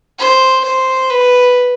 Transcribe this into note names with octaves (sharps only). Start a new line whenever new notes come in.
C5
C5
B4